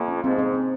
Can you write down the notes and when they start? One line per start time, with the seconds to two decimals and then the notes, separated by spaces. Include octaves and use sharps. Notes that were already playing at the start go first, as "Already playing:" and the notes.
Already playing: F2 A#3
0.08 C#4
0.24 G#2 C4
0.39 C4
0.54 C4